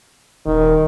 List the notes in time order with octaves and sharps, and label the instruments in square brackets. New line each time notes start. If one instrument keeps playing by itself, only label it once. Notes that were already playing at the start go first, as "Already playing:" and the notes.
[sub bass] D#1 [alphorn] D#3